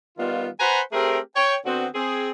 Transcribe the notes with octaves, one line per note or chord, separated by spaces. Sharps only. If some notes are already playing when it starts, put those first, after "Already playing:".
D#3 G3 B3 F4
B4 C5 F#5 G#5 A#5 B5
A3 C4 G4 G#4 A#4
C#5 G5
D3 B3 C4 F#4 C5
C4 G#4